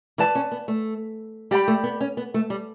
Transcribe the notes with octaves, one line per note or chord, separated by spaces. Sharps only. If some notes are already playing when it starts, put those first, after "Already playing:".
E3 B4 D5 A5
C#4
B3
A3
G3 G4 D5 G5 B5
A3
B3
C#4
B3
A3
G3